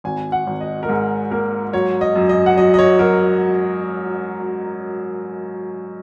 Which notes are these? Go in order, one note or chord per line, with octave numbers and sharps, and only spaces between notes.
G#1 G#5
F#5
G#1
D#5
A#4
G#2 G#4
A#3 A#4
F#3 C#5
D#5
F#2
D#5
F#5
F#3 D#5
D#5
C#5
F#3 A#4